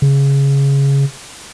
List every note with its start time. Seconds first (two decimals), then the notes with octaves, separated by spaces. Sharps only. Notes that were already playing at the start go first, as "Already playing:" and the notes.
0.02 C#3